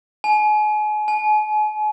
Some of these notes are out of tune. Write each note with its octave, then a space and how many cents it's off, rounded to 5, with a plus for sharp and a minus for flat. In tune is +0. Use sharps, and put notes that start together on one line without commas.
G#5 +35
G#5 +45